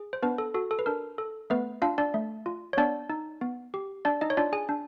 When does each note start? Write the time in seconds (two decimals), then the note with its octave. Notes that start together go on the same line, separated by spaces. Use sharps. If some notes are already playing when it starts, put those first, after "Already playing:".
Already playing: G#4
0.13 C5
0.23 B3 D4 B4
0.38 A4
0.54 F#4 A4
0.71 A4
0.79 B4
0.86 D4 A#4
1.18 A4
1.50 A3 B3 B4
1.82 D4 F4 F5
1.98 D4 D5
2.14 A3
2.46 F4
2.73 C#5
2.77 B3 D4 D5
3.10 D#4
3.41 B3
3.74 G4
4.05 D4 D5
4.21 D#4 D#5
4.30 C#5
4.37 D4 F4 D5
4.53 G#4 G#5
4.69 D4